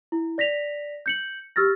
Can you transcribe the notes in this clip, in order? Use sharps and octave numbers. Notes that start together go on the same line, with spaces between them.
E4
D5 A#6 B6 F7
G6 C#7 F#7
G4 E6 F6 A6 A#6